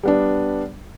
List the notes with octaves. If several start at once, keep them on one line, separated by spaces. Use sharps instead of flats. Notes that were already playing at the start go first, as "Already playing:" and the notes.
G3 B3 D4